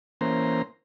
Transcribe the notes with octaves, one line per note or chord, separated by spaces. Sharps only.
E3 A#3 C#4 C5 A#5 C6